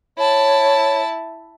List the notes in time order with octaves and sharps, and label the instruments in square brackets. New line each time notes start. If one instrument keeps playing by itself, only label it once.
[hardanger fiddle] E4 A5 [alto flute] C#5